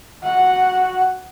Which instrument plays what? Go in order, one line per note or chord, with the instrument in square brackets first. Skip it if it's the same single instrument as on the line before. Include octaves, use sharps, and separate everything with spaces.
[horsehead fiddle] F#4 F#5